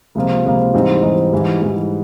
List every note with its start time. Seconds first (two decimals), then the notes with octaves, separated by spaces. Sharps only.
0.15 C#2 C3 F3 A#3
0.45 C#2 C3 F3 A#3
0.74 G#2 E3 G3 C4 D#4
1.03 G#2 E3 G3 C4 D#4
1.32 G#2 E3 G3
1.62 G#2 E3 G3